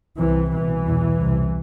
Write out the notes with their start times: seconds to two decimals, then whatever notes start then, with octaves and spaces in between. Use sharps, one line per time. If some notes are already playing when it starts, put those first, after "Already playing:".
0.18 C2 C3 E3
0.53 C2 B2 E3
0.87 E2 B2
1.20 C2 C3